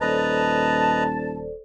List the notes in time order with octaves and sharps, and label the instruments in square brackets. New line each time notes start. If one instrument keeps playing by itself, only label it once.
[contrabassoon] D#1 [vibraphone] A4 C5 D5 [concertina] B4 D#5 A#5 [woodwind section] A5